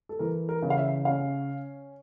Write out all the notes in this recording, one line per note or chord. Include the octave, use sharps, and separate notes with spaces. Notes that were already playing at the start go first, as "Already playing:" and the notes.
A4
E3 A#4
A#4
C#3
F5
E5
C#4 F5